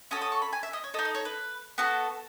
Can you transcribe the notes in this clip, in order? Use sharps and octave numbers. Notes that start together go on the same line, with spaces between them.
C#4 F#4 A4 D#6
D#6
C#6
B5
G#5
E5
D#5
C#5
D#4 A4 D#5
D#5
C#5
B4
B3 F#4 A4